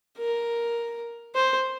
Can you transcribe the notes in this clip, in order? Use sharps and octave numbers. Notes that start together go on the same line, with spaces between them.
A#4
C5